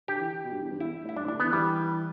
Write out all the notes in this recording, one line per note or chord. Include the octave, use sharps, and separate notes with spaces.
D3 G4
E3
B2
G2
E2
G2
E2 E4
A2
E4
G2 D4
A2
D4
D3
E3 B3
E3 G3